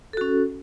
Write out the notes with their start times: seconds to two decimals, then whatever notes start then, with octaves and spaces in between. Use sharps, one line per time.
0.13 A4
0.17 F#4
0.21 C#4